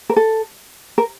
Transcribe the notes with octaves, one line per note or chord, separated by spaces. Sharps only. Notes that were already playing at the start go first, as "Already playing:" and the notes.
A#4
A4
A#4